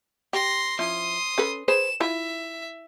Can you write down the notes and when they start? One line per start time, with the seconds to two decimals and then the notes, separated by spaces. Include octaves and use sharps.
0.33 G4 C6 A#6
0.79 F3 C#4 E4 C6 D#6
1.38 C#4 A4 B4
1.68 G#4 B4 C5 E7
2.00 E4 F4 E5